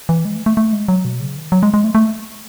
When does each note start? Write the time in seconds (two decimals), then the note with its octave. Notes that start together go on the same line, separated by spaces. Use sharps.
0.09 E3
0.25 G#3
0.36 A3
0.46 A3
0.57 A3
0.73 G#3
0.88 F#3
1.05 B2
1.20 C#3
1.36 D#3
1.52 F#3
1.63 G#3
1.74 G#3
1.84 A3
1.95 A3